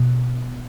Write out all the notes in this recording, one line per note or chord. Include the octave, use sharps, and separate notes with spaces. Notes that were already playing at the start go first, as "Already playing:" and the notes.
Already playing: B2